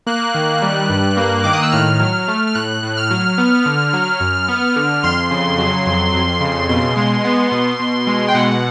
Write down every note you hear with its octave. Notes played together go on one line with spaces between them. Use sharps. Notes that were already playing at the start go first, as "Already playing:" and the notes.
A#3 F#6
D#3
G3
G2
A#3
D#3 D6
D#6
E6
A2 F6
F#3
A3
F6
A2 F#6
A2
F6
F#3
B3
D3
F#3
F#2
B3
D3
F2 C6
C#3
F#3
F2
F2
C#3
B2 C6
G#3
B3
B2
B2
G#3
G5
B2 F#5